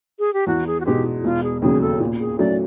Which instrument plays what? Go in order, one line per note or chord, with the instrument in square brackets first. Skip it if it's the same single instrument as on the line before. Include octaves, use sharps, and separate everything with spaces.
[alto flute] G#4
G4
[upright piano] E2 [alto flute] F#4
[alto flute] G#4
F#4
[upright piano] B2 G#3 [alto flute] G4
[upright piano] E1 [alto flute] F4
[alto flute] G#4
[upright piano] D#2 C#3 F#3 [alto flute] G#4
[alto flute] A4
[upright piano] A#2
[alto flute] G#4
[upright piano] F#3 A3 C#4 [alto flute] D5